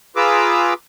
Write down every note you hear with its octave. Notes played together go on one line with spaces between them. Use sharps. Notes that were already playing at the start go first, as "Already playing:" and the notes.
F4 G#4 B4 A#5 D6 E6